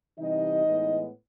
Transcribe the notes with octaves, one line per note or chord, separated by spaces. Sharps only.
C3 E3 G3 D#4 D#5
A2 E3 G#3 B3